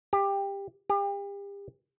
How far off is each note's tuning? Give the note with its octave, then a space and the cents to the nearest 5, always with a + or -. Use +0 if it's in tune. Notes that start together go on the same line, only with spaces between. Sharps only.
G4 +15
G4 +35